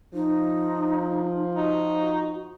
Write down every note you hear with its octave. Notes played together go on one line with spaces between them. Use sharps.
F3 D#4
D#4 F#4